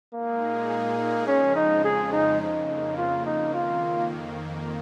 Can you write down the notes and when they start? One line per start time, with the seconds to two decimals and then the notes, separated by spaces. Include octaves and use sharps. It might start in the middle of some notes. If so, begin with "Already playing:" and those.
0.14 A#2 G#3 A#3 D#4 G#4
1.27 F2 C#3 F3 G#3 C#4
1.55 D#4
1.84 G#4
2.12 D#4
2.40 F2 C#3 A#3 D#4
2.97 F4
3.26 D#4
3.53 F2 D#3 A#3 F4